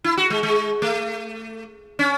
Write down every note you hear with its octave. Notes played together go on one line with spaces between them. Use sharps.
E4
F#4
G#3
G#3
A3
C#4